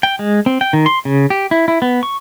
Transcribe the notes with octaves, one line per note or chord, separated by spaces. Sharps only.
G5
G#3
C4
G5
D#3
C6
C#3
G4
E4
E4
B3
C#6